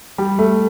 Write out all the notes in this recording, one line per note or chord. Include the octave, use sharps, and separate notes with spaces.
G3
A3